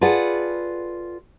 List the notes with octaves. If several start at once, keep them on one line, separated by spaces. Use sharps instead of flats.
F4 G#4 A4 B4 D5 F#5